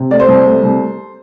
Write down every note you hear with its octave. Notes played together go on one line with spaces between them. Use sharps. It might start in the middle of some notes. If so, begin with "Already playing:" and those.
Already playing: C3
A3 D5
C5
C2
A3
C2